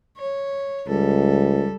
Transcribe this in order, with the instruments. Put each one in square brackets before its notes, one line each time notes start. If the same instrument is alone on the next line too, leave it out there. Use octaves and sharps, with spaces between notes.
[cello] C#5
[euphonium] C#2 [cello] G3 A4